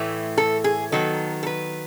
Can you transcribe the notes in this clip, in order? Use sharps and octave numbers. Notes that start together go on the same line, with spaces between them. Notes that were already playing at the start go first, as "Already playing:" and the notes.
Already playing: A2 E3 A3
A4
G#4
D#3 F#3 B3 A4
A4
B4